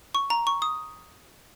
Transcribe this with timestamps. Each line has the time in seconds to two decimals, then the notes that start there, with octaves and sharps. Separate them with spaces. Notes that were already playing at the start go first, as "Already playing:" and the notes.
0.15 C#6
0.30 A#5
0.47 C#6
0.62 D#6